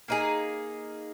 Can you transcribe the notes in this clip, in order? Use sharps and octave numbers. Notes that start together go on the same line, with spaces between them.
A#3 D#4 G#4